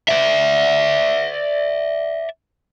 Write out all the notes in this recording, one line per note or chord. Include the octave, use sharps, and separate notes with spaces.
D5 E5